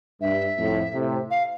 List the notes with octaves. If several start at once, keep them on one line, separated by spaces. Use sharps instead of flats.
G2 E5
F2 A2
A2 C3
F5